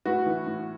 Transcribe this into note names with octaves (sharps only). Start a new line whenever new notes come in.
A2 F#4 B4
E3
A2